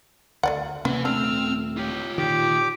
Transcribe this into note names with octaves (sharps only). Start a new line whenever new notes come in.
D2 A3 D5 F#5
C3 A#3 B3 C#4 B4 G#5
D#1 A3 C4 D4 E6 F6
F4 G4 C#5
A#2 D#3 G4 D6